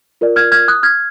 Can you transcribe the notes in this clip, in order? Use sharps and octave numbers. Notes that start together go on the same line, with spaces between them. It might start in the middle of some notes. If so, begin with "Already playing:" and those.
F4 A#4 D5
F6 G#6
F6 G#6
D#6 F#6
F6 G#6